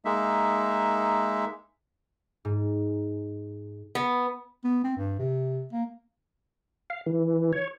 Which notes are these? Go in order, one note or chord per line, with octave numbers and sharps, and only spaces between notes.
G#3 A#3 D#4 E5
G#2
B3
B3
C4
G2
C3
A#3
F5
E3
C#5